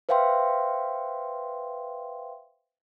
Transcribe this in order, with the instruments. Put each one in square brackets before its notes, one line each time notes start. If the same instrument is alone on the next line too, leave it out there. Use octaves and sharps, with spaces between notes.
[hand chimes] B4 C5 E5 F5 G5 C6